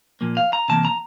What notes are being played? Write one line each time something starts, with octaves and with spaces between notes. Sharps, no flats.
A#2 F3 A#3
F5
A#5
C3 E3 A#3 A5
A#5